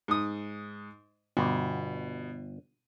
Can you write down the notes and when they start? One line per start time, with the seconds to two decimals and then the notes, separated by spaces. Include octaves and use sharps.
0.08 G#2 D#6
1.37 G1 B2